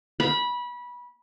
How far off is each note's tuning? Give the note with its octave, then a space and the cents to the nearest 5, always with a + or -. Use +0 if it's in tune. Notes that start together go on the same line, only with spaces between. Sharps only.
B5 -20